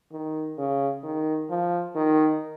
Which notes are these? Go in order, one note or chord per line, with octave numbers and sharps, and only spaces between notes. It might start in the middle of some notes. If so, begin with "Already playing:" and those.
D#3
C#3
D#3
F3
D#3